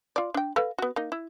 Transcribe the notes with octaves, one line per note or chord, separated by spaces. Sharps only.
F4 D5
D4 G5
A4 B4 F5
B3 F#4
A#3 D#4
E4